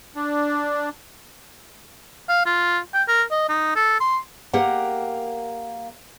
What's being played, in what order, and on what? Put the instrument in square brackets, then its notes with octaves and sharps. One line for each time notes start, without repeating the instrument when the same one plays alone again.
[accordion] D4
[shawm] F5
F4
G5
A#4
D#5
D#4
A4
C6
[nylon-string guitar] A#3 G4 A#4 F#5